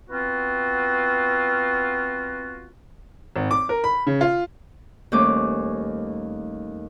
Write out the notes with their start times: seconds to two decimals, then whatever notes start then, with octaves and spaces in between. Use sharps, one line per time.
0.10 B3 C4 F4 F#4
3.36 G#1
3.51 D6
3.69 A#4
3.84 B5
4.07 C#3
4.21 F4
5.12 D#2 G3 A3 C4 C#4 D6